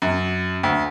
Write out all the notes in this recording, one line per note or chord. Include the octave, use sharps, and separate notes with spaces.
F#2
D2